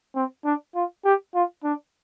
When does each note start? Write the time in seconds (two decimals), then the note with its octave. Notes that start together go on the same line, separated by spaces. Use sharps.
0.15 C4
0.45 D4
0.75 F4
1.05 G4
1.35 F4
1.64 D4